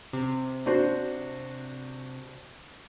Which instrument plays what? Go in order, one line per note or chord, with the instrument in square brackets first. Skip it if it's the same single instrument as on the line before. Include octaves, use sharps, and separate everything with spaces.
[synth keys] C3
[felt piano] D4 F#4 C5